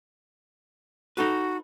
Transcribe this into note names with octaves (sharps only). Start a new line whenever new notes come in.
D#4 F#4 A4 B4